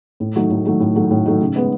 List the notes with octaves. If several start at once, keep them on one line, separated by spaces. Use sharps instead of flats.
A2
F#3 A3 D#4
A2
F#3 A3 D#4
A2
F#3 A3 D#4
A2
F#3 A3 D#4
C#3
G#3 B3